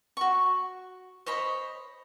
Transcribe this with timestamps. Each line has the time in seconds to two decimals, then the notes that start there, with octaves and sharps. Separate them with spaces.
0.17 F#4 C#6
1.26 C5 C#5 D#5 B5